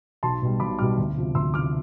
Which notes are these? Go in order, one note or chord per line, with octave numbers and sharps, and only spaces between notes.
B1 A5 C6
B2 G3
B1 B5 D6
B2 G3 D6 F6
D2
C3 F3
D2 C6 E6
C3 F3 D6 F6